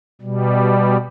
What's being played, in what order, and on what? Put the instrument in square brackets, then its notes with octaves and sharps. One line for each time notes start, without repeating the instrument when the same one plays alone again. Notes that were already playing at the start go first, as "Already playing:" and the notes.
[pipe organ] B2 G3